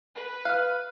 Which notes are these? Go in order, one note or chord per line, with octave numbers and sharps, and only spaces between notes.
B4
F5 F6 F#6